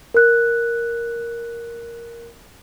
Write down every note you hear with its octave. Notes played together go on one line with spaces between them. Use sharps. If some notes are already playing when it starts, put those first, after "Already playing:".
A#4 F#6